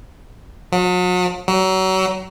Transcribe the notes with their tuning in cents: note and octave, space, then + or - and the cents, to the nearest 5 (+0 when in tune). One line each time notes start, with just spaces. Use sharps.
F#3 -40
F#3 +30